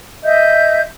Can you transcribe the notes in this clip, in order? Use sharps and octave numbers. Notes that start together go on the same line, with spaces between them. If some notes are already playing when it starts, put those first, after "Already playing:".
D#5 E5 G6